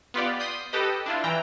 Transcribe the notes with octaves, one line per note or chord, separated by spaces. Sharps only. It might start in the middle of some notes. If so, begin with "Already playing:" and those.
B3 F4 G4 D5
C6 D#6 G6 B6
G4 A4 B4 D#5
D4 E4 F4
E3 G5 A#5